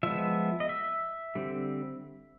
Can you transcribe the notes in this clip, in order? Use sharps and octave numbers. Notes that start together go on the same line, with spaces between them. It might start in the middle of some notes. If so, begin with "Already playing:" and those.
F3 G#3 B3 E5
D#5
E5
D3 G3 C4